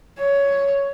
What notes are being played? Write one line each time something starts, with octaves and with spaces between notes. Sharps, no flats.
C#5